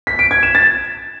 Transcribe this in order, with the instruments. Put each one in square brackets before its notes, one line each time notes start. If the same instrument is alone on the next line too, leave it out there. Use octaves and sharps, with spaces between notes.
[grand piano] B6
D7
G#6
E7
A6